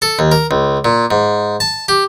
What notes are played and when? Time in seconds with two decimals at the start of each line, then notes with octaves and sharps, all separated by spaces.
0.02 A4
0.19 D#2
0.32 A#4
0.51 C#2
0.85 A#2
1.11 G#2
1.60 A5
1.88 G4